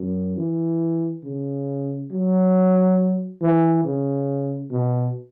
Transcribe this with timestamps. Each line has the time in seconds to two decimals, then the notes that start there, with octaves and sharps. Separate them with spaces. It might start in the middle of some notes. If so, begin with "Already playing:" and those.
Already playing: F#2
0.37 E3
1.24 C#3
2.11 F#3
3.41 E3
3.85 C#3
4.71 B2